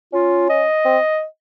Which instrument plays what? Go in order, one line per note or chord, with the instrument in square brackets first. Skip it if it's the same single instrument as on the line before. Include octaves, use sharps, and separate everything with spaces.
[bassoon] C#4 [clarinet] F4
[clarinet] D#5
[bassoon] C4